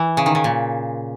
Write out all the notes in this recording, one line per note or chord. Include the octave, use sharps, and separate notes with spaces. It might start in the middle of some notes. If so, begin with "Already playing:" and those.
Already playing: E3
C#3
D#3
C#3
A#2